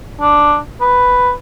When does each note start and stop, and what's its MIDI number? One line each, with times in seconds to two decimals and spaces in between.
0.21 0.57 62
0.81 1.32 71